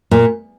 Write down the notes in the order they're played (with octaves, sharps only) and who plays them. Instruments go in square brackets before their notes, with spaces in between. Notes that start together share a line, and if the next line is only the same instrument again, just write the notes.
[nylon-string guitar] A#2